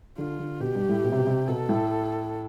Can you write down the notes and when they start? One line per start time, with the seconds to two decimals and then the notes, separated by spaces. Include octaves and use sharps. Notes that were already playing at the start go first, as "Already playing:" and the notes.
0.18 D3 F4
0.39 D3
0.60 B2 G4
0.75 G2
0.89 A2
1.04 B2
1.12 C3
1.19 B2
1.27 C3
1.47 B2 A4
1.69 A2